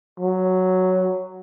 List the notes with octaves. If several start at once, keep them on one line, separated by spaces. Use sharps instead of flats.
F#3